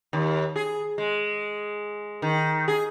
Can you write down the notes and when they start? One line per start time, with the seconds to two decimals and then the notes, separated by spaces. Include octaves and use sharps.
0.13 D#2
0.56 G#4
0.98 G#3
2.22 D#3
2.68 G#4